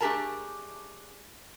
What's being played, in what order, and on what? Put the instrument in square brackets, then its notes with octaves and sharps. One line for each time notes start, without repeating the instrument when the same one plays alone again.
[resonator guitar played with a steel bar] A3 D4 G4 G#4 A#4 A5